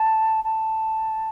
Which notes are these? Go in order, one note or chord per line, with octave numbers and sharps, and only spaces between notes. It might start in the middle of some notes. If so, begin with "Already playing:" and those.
Already playing: A5
A5